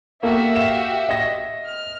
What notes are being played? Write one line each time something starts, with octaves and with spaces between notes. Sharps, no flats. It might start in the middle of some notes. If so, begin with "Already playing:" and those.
A#3 F#4 G4 A4 E5
F5 E7
D#5 A#6
F6